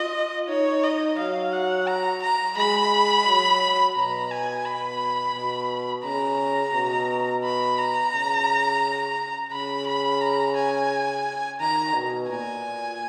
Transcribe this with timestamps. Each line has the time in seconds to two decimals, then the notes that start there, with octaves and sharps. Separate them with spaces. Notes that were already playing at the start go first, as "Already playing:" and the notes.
Already playing: F4 D#5
0.49 D#4 C#5
0.83 D#5
1.18 F#3 F5
1.53 F#5
1.87 A#5
2.22 A#5
2.58 G#3 B5
3.27 F#3
3.96 B2 A#5
4.31 G#5
4.65 B2 B5
5.35 B2
6.04 C#3 A#5
6.75 B2
7.44 B5
7.78 A#5
8.14 C#3
9.52 C#3 B5
9.87 B5
10.21 A#5
10.56 G#5
11.60 D#3 A#5
11.94 B2
12.29 A#2 G#5